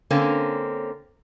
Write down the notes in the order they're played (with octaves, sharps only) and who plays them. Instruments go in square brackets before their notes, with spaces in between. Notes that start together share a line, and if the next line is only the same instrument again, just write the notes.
[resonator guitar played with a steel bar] D3 A#3 C4 C#4